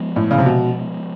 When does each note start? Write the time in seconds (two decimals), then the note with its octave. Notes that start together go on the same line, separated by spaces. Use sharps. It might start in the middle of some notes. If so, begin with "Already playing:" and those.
Already playing: F3 G#3 B3
0.16 A2
0.31 C#3
0.38 C3
0.46 B2